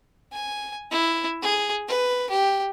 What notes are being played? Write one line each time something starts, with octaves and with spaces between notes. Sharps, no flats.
G#5
E4
G#4
B4
G4